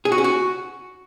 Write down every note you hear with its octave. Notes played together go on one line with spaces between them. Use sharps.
G#4
F#4
C#4
F#4